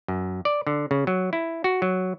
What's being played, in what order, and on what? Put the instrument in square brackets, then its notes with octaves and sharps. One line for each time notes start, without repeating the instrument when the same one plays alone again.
[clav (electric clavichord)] F#2
D5
D3
C#3
F#3
E4
F#4
F#3